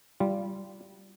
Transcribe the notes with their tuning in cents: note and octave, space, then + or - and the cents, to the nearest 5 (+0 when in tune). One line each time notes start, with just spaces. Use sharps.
G3 -10 F4 -25